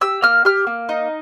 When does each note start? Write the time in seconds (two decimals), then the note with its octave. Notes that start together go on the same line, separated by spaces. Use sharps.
0.01 G4 E6
0.22 A#3 F6
0.45 G4 F6
0.67 A#3
0.89 D#4